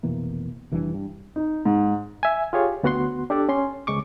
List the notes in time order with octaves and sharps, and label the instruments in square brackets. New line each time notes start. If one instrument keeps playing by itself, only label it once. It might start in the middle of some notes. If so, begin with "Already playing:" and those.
[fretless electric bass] F1 B2 E3 A#3
F1 E3 G3 D4
G2
[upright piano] D#4
G#2
[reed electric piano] E5 G#5
F4 G4 G#4 C#5
D2 B3 F#4 F#5 C6
D4 G4 A4 D5
C#4 C6
C#2 G#3 C#6 D6